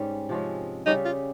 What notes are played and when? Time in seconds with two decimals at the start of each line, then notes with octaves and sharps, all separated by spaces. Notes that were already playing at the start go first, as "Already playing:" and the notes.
Already playing: G#2 G3 C#4
0.29 C3 F3 G#3 C#4
0.86 C#3 G3 C#4 D#4 G4
1.05 F4